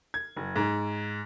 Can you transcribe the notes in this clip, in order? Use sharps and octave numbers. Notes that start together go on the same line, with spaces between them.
G#6
F#1
G#2